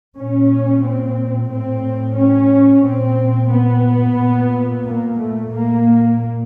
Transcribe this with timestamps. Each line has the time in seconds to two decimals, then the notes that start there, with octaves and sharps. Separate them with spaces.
0.17 A#2 C#4
0.84 C4
1.51 A2 C4
2.17 C#4
2.85 A#2 C4
3.52 B3
4.19 A#2
4.85 A#3
5.19 A3
5.53 A#2 A#3